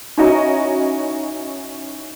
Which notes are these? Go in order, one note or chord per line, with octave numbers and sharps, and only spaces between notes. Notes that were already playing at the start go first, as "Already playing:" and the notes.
C#4 D#4 E4 F#4 D#5 A#5